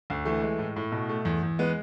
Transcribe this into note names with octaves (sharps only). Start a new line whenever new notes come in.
D2
E3 A3
G#3
A2
A2
B2
A3
E2
E2
G#3 B3